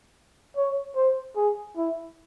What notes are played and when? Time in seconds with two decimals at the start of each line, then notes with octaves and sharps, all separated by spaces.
0.56 C#5
0.96 C5
1.36 G#4
1.77 E4